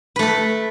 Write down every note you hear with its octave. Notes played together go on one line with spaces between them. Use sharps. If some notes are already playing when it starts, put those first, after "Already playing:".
A3 A4 B4